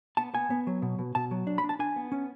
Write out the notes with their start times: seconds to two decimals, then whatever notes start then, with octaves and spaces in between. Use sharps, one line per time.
0.17 B3 A5
0.34 B3 G#5
0.50 B3
0.67 F#3
0.82 B2
0.99 B2
1.15 B2 A5
1.31 F#3
1.47 D4
1.58 B5
1.64 D4
1.69 A5
1.79 D4 G#5
1.96 B3
2.12 C#4